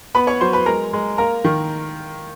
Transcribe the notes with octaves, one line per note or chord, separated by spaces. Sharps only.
B3 B4 B5
C#5 C#6
F#3 C5 C6
B4 B5
G#3 A#4 A#5
G#3
A#3 A#4 A#5
D#3